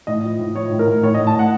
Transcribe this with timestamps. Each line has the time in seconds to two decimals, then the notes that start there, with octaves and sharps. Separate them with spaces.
0.07 A2 D#5
0.24 F3
0.39 A2
0.56 F3 C#5
0.71 A2
0.79 A#4
0.87 A2
1.03 A2 C#5
1.14 D#5
1.19 A2
1.27 A5
1.35 A2 F#5